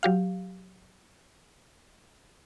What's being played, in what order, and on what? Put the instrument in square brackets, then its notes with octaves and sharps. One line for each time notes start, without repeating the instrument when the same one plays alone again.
[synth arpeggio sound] F#3 G4 F5